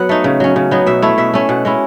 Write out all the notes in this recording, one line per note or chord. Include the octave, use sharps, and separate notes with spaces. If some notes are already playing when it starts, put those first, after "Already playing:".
Already playing: F#3 B3 F#5
A3 D#4
C#3
F#3 C#4
C#3
F#3 B3 D#4
B2 E5
A3 E4 C#5
B2 E5
A3 C#4
B2 F#5
G#3 C#4 E4